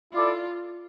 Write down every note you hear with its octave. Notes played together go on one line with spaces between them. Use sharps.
E4 F4 A4 D5